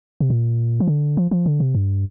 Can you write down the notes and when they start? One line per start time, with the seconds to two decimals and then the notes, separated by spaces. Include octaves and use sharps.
0.20 C3
0.30 A#2
0.80 F3
0.88 D3
1.17 F3
1.31 F3
1.46 D3
1.60 C3
1.75 G2